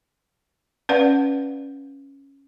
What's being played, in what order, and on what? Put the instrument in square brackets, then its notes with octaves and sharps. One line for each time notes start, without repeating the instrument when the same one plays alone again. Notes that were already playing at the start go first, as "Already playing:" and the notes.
[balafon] C#4 B4 D5 F5 F#5